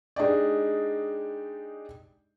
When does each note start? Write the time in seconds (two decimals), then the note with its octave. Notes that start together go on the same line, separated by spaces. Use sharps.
0.16 G#3 D4 D#4 G4 D5